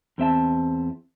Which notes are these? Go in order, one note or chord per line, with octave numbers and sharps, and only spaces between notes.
E2 C4 E5 A5